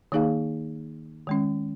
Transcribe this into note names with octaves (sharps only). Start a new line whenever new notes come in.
D#3 A#3 D#4 G#4 F5
D#3 G#3 C#4